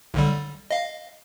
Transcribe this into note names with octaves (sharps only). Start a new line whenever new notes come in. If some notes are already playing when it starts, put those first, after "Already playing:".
B1 D3 G3
D#5 F5